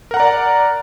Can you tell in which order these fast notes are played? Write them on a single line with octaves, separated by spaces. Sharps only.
A#4 F#5 A#5 D5